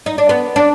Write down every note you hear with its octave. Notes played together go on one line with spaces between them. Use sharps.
D#4
D4
B3
D4